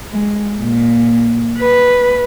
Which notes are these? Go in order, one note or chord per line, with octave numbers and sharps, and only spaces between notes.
G#3
A#2
B4